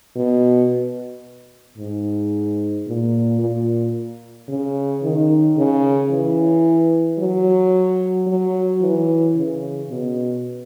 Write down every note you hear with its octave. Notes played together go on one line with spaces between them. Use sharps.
B2
G#2
A#2
A#2
C#3
D#3
C#3
E3
F#3
F#3
E3
C#3
B2